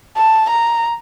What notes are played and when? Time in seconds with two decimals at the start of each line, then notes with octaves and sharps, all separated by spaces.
0.17 A5
0.49 A#5